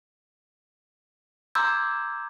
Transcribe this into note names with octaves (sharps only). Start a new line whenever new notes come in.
A#5 C6 D6 E6 G6 G#6